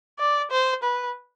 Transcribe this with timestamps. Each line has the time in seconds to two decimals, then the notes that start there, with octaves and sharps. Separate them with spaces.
0.19 D5
0.51 C5
0.83 B4